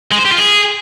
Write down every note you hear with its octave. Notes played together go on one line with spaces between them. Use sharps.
G#3
C5
G4
F4
G#4